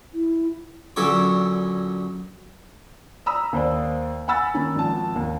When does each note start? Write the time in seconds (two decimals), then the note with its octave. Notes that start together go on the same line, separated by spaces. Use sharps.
0.14 E4
0.96 F#2 A#2 D3 A4 C#5 D6
3.26 A#5 B5 D#6 E6
3.53 D#2 C5 D5
4.28 F#5 G#5 B5 E6 A6
4.54 D#3 A#3 C#4
4.76 G#1 F3 A5
5.16 D#2